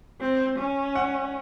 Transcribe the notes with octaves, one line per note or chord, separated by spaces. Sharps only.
C4
C#4
F#5